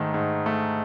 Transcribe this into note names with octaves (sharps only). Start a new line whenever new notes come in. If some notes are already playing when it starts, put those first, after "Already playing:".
Already playing: G#2 D#3 A3
G#2
A3